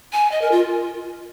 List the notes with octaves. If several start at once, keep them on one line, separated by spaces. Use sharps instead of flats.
G#5
D#5
A#4
F4